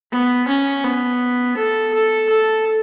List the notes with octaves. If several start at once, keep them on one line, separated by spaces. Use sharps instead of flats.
B3
C#4
B3
A4
A4
A4